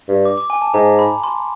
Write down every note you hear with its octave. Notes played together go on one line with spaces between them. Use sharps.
G2
D6
D6
G#5
A5
G#2 A#5
B5
C6